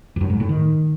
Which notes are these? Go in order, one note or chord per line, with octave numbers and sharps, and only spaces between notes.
F2
F#2
G#2
A2
D#3